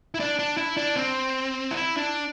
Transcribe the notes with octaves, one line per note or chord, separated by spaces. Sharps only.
E4
D4
D4
E4
D4
C4
E4
D4